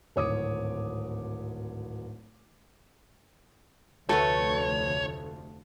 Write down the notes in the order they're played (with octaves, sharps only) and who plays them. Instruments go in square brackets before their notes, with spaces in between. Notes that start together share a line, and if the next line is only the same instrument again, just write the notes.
[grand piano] D1 G#1 C#5 D6 D#6
[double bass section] F1 D2 F3 [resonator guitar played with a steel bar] A3 F#4 B4 [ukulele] A4 [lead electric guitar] C#5